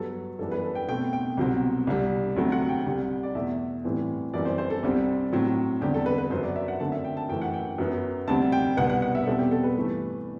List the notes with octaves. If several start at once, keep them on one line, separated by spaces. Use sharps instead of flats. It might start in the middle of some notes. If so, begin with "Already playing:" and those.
Already playing: G2 F#3 B3 A4
F#2 E3 G3 B3 A4
B4
A4
G5
B2 A3 C4 G5
G5
C2 B2 F#3 C4
C2 C3 G3
D2 C3 F#3 A3 C4
F#5
G5
C2 C3 G3
D5
E2 B2 A3 E5
A2 E3 G3 C4
F#2 E3 G3 C4 D5
C5
C5
A4
C2 C3 G3 C4
A2 F#3 C4
E2 D3 G3 C4 G4
A4
B4
B4
F#2 F#3 B3 C5
D5
E5
F#5
F#2 D3 A3 C4 A5
E5
G5
A5
F#2 E3 A3 G5
F#5
G5
F#2 F#3 B3
D2 C3 G3 C4 A5
G5
C2 B2 G3 B3 F#5
F#5
F#5
E5
E2 B2 G3 C4 A4
G4
A4
B4
G2 E3 A3